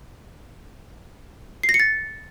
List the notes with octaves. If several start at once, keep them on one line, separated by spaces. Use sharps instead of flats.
C7
A#6
C#7
A6